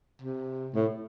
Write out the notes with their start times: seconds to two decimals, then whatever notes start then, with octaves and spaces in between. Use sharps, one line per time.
0.22 C3
0.74 A2